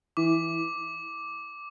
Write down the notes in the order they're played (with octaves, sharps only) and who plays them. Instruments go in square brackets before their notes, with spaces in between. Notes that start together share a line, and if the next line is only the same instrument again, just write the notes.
[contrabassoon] E3 [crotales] D6